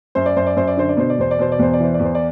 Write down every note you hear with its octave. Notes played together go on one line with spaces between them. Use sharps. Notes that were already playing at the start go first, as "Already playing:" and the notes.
F#2 C5
D5
F#2 C5
D5
F#2 C5
D5
D3 C5
D5
B2 C5
D5
E2 C5
D5
B2 C5
D5
E2 C5
D5
E3 C5
D5
E2
C5
D5